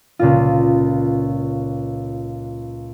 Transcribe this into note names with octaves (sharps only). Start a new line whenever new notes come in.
C#2 A#2 F4